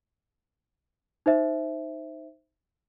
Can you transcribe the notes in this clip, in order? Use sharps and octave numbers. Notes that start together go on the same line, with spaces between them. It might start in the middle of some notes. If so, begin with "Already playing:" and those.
D#4 C5 E5